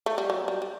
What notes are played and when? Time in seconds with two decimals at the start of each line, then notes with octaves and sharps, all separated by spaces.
0.06 A3
0.18 G3
0.30 F#3
0.48 G3
0.62 G3